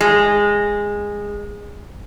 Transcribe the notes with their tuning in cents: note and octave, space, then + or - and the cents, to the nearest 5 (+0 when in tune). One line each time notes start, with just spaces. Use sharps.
G#3 -15